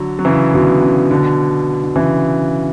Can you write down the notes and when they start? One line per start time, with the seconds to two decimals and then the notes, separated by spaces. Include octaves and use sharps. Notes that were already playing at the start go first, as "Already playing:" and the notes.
Already playing: D3 F#3
0.19 F#3
0.25 C#3 E3
0.54 B2 D3
0.82 C#3
1.11 B2 D3
1.84 D3
1.96 C#3 E3